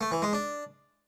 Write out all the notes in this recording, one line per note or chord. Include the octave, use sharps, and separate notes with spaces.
A3
E3
G#3
D4